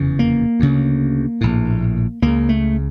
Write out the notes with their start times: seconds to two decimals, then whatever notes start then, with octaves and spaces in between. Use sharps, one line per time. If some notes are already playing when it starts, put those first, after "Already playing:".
Already playing: F1 E2 C#3
0.19 A#3
0.60 D2 C#3
1.41 A#1 A2
2.22 C#2 C#3 A#3
2.49 A3